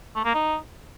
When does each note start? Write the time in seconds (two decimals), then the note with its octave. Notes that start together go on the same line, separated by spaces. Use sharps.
0.15 A3
0.25 A#3
0.34 D#4